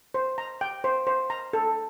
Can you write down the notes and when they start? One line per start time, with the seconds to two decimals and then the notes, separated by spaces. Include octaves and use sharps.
0.14 C5
0.38 A#5
0.61 G5
0.84 C5
1.07 C5
1.30 A#5
1.53 A4